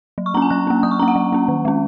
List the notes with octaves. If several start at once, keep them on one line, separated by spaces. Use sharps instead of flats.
F#3
C#6
A#3 C#4 A#5
G#5
F#3 F#6
A#3 C#4
F#3 D#6
C#6
A#3 C#4 A#5
F#5
F#3
A#3 C#4
D#3
G#3 C#4